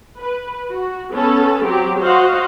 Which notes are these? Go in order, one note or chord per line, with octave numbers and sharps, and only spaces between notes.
B4
F#4
B3 C#4 A4
F#3 C4 G4
F#4 C5 D#5 F5 F#5